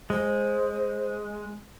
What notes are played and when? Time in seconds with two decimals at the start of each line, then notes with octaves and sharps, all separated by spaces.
0.10 G#3 C5